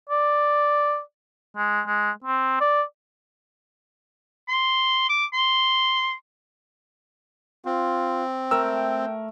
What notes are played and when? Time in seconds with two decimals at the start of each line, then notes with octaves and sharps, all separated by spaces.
0.10 D5
1.57 G#3
1.87 G#3
2.24 C4
2.60 D5
4.48 C6
5.09 D6
5.33 C6
7.65 C4 F4
8.51 A3 A#4 G5 E6